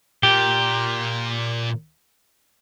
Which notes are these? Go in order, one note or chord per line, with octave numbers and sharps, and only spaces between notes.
A#2 G4